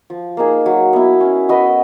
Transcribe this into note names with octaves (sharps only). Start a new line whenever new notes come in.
F3
A#3 D#4 G#4
F#3
B3 E4
C#4
F#4 B4 D#5